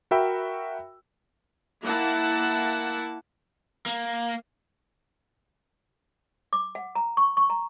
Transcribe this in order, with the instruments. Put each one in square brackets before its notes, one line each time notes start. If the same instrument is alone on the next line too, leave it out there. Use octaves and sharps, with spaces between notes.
[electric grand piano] F#4 A#4 E5 G5 B5 E6
[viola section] A#3 E4 F#5 A5
[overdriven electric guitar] A#3
[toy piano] D6
F#5
A#5
C#6
C#6
A#5